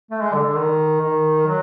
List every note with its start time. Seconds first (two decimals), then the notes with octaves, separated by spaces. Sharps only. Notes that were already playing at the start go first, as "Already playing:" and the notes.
0.11 A3
0.22 G#3
0.33 D3
0.45 D3
0.56 D#3
1.01 D#3
1.46 F#3